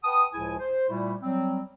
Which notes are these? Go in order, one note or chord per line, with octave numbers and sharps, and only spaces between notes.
B4 F#5 G5 A5 D#6
C#2 A2 F3 E4 G#4 G#5
C5
A#2 G3 A3 E4
F#3 G3 C4